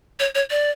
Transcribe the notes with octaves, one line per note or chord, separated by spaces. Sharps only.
C#5
C#5
D5